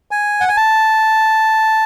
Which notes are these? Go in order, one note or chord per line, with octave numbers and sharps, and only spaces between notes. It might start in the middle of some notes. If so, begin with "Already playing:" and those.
G#5
F#5
G#5
A5